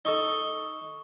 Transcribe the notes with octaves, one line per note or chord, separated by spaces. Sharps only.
D#4 A4 C#6 G7